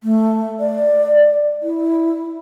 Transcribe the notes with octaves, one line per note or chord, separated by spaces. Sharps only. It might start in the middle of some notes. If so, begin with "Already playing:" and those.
A3
D5
E4